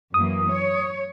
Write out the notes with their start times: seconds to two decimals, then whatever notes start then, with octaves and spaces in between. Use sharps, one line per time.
0.14 F#2 E3 A#3 D#6
0.50 C#5